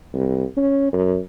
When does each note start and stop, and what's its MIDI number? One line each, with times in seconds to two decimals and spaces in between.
0.14 0.44 36
0.57 0.88 61
0.93 1.19 42